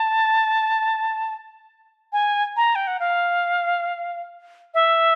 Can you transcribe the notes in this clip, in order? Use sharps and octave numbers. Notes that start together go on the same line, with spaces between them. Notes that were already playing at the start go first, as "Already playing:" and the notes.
Already playing: A5
G#5
A#5
G5
F#5
F5
E5